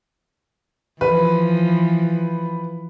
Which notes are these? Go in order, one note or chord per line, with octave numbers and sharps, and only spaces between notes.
E3 F3 B4